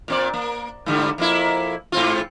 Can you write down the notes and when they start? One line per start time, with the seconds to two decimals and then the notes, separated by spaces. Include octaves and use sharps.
0.08 A#2 C4 D5
0.33 A#3
0.86 G#2 D3 G3
1.18 F2 A#3 E4
1.92 G#2 C4 F4